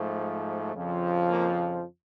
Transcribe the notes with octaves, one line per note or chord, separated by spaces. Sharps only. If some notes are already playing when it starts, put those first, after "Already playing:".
Already playing: G#2 F3 A3
F2 C#3 F3
A#3